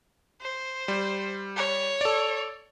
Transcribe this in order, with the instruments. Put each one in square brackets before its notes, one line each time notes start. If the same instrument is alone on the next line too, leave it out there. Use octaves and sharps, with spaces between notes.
[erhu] C5
[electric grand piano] G3
[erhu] C#5
[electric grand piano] A4 D5